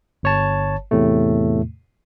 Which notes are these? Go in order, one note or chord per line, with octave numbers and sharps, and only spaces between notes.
G1 C#5 A5
E2 A2 C3 A3